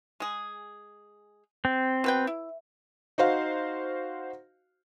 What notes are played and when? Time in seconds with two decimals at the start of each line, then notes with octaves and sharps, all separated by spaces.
0.20 G#3 G#4
1.65 C4
2.04 B2 B4 G5
2.27 E4
3.18 D#4 F#4 C5 F5